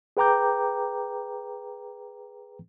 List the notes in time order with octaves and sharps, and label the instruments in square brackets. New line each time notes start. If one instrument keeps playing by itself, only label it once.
[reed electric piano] G#4 B4 G5 A#5 D6 G6